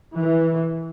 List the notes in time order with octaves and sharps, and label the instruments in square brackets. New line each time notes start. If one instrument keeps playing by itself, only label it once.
[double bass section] E3